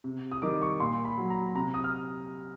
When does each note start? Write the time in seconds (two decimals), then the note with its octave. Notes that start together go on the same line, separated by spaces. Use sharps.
0.04 C3
0.32 D#6
0.42 D#3 G3 D6
0.62 C#6
0.80 A#2 C6
1.05 B5
1.18 F#3
1.30 A#5
1.49 B5
1.55 C3 A#5
1.74 D#6
1.84 F6